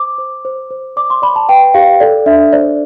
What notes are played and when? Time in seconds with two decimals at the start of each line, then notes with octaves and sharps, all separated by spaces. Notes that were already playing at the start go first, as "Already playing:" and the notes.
Already playing: C5 D6
0.18 C5
0.45 C5
0.70 C5
0.96 D5 D6
1.10 C6
1.22 D5 B5
1.36 A5
1.49 B4 G5
1.74 G4 F5
2.00 A4 D5
2.26 D4 E5
2.53 C5 D5